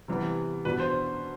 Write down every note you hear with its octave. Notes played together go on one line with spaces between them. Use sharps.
C3 E3 G3 B3
E2 B2 B3 D4 B4
C5